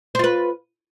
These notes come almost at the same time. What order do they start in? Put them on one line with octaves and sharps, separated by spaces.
C5 F4 B4